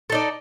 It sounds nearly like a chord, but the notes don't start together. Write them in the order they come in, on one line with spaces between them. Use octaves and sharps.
A4 D#4 D5